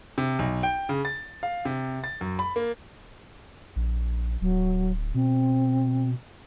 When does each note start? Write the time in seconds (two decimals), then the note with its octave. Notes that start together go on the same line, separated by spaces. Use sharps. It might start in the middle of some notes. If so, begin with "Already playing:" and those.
0.18 C3
0.39 B1
0.63 G5
0.89 C#3
1.05 A6
1.43 F5
1.65 C3
2.04 A6
2.21 F#2
2.39 B5
2.56 A#3
3.76 A#1
4.41 D1 F#3
5.14 B2 C4